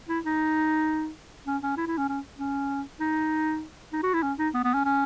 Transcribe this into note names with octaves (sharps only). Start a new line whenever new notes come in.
E4
D#4
C#4
C#4
E4
E4
C#4
C#4
C#4
D#4
D#4
F#4
E4
C#4
D#4
B3
B3
C#4
C#4